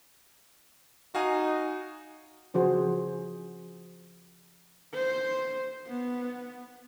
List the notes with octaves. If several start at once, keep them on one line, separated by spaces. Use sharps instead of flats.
D#4 F#4 F5 G#5
C#3 F3 F#4 G#4 C5
C5
B3